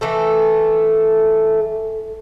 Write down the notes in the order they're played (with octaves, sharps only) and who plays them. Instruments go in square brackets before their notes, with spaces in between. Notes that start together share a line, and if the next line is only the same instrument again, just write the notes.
[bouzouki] E3 A3 A4